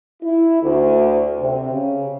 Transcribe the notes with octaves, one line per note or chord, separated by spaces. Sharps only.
E4
D2
C3
C#3